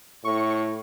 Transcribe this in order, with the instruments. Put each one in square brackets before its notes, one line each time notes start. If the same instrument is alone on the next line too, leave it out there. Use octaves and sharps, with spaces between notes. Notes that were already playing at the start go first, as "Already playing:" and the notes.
[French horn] A2 [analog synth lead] C#6